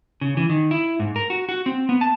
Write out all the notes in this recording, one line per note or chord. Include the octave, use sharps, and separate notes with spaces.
C#3
E3
D#3
E4
G#2
A#4
F#4
F#4
C4
B3
A5